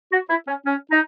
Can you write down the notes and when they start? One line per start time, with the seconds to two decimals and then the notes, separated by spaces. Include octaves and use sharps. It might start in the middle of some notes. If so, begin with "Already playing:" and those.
0.12 F#4
0.30 E4
0.48 C#4
0.66 C#4
0.91 D#4